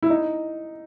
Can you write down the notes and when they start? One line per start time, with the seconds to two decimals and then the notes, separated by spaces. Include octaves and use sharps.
0.03 E4
0.10 D#4